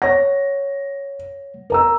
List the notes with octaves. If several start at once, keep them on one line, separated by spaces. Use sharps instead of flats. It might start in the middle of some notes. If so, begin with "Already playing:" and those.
C#5 F#5 A#6
A#4 A#5 E6